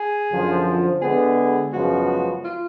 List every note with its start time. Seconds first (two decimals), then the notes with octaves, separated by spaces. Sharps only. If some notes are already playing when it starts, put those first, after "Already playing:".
Already playing: G#4
0.31 F#2 D3 F3
1.02 D3 G#3 B3 G#4
1.73 F#2 C#3 F3 G#3 B3 F#4
2.45 F4